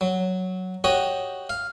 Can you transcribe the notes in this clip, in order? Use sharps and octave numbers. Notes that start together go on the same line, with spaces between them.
F#3
F#4 G4 C#5 D#5
F5